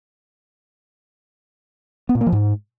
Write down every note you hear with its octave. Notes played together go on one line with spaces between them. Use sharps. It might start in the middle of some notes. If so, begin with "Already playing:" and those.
B3
A#2
A#3
F3
G#2